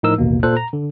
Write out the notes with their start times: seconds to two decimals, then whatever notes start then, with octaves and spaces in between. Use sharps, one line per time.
0.03 A2 F3 D#4 A#4 E6
0.18 A1 D#2 B2 A#3
0.43 A#2 A4 C5 F#6
0.57 A#5
0.73 D3